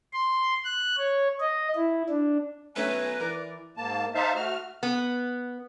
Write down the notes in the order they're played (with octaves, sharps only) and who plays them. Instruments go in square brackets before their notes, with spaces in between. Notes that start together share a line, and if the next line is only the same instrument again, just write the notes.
[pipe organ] C6
F#6
C#5
D#5
E4
D4
[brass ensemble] B1 G#5 A#5 [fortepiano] A3 C#4 E5 [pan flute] B4
[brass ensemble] E3 D5 [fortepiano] A#4
[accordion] G#2 A#3 A5
D#4 C5 E5 F5 A5
A3 F#4 F6
[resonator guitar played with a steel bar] B3